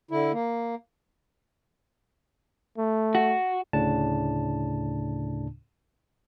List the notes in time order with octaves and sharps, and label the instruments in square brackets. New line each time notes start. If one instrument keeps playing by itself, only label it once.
[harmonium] D3 E4
A#3
[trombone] A3
[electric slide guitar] F#4
[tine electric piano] D2 A2 C#3 D4 A5